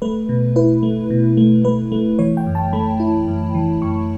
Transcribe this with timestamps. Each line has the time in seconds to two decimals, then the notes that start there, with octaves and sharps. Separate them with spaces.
0.02 A3 B4
0.29 B2
0.56 E4 B4
0.83 A3
1.10 B2
1.37 A3
1.64 A3 B4
1.92 A3
2.19 E3 C#5
2.37 G5
2.47 F#2
2.55 A5
2.73 A3 B5
3.00 E4
3.28 F#2
3.54 E3
3.81 F#2 C#6